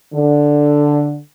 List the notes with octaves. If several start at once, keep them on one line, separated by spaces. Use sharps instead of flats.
D3